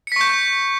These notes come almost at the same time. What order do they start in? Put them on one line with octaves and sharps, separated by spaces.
C#7 B6 C#6 G6